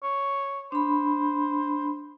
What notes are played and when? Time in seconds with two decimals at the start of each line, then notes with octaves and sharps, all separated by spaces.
0.03 C#5
0.72 D4 C5 B5